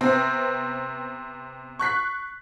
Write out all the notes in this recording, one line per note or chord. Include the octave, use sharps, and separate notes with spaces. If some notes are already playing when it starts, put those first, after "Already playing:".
C3 B3 C4
C#6 F#6 B6 C7